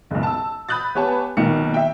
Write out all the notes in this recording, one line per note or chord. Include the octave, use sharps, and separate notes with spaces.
F#1 B1
A5 E6
B5 D#6 F#6 G6 A6
B3 G4 B4 C#5 G#5 A5
B1 A#2 D#3 C#7
E5 G5